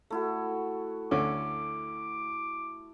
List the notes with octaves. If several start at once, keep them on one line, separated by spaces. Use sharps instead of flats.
A3 E4 F#4
D2 D3 C#4 D6